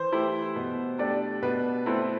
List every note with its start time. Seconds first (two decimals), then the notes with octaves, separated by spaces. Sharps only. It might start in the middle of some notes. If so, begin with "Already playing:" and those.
Already playing: E3 C5
0.12 A3 E4 G4
0.56 B2
0.98 A3 D4 G4 D5
1.42 B2 B4
1.86 A3 C4 E4